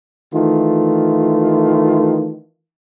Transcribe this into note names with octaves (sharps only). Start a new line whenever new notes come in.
D#3 E3 A3 F4